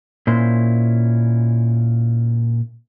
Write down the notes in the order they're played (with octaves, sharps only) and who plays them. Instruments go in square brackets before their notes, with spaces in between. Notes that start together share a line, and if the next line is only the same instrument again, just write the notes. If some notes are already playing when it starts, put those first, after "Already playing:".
[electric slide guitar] A#2 C#4 E4 C5